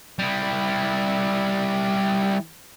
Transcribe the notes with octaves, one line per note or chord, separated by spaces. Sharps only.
G3 E4